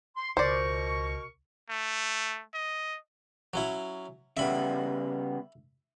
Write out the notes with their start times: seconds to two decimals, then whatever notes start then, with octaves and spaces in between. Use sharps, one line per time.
0.17 C6
0.37 C#2 B2 A#4 C5 D5 C#6
1.69 A3
2.54 D#5
3.54 F#3 C#4 E4
4.37 C#3 G3 B3 E5 B5